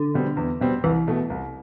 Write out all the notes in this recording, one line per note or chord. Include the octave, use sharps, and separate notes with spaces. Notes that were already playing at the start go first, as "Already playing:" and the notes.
Already playing: D3
B2 G3 C4
E2
B2 G3 C4
C2 E3
B2 A3
C2